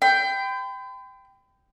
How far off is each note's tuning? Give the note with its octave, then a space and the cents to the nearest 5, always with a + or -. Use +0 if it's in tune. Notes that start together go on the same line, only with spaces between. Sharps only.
G5 +0 B5 +45